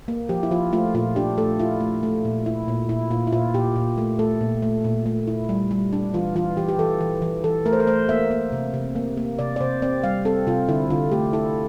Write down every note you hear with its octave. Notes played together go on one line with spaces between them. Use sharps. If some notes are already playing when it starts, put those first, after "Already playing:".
A#3
F3 G4
E4
F3 F4
A3 F4
A#2 F4
D4 G4
A3 A4
E4 F4
A3
A3
A#2
E4
A#2
A#2 E4
A#2 F4
E4
A#2 F4
A#2 G4
A#2
A3
A3 A4
A#2
A3
A#2
A3
E4
G3
G3
D4
E3 F4
E3 F4
E3 G4
G4
E3 A4
E3
E3
E3 A4
A3 A#4
C5
A#4
A3 C5
A#3 E5
A#3
C3
C3
A#3
A#3
C3 D5
D5
C3 C5
C4 D5
G3 F5
C4 A4
C3 F4
D3 E4
D3 F4
A3 G4
E4 A4